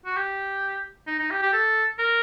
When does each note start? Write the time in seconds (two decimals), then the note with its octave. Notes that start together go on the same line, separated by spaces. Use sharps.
0.06 F#4
0.17 G4
1.07 D#4
1.19 D#4
1.31 G4
1.42 G4
1.53 A4
1.99 A#4